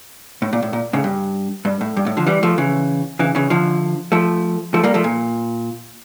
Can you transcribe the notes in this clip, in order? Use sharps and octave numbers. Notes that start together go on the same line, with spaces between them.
A2
A#2
A2
A#2
A2 C#3
G2
G2
A2
G2
A2
D3 F3
E3 G3
F3 A3
C#3 E3
C#3 E3
C#3 E3
D3 F3
F3 A3
F3 A3
G3 A#3
F3 A3
A#2